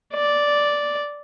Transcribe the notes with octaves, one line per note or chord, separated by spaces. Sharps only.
D5